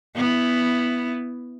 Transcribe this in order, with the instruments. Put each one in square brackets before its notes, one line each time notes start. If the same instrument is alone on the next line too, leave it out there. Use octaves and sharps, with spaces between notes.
[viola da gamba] B3 E4